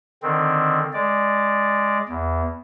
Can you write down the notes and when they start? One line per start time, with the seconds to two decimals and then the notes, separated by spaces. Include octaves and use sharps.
0.23 D3 D#3 C4
0.93 G#3 D5
2.09 E2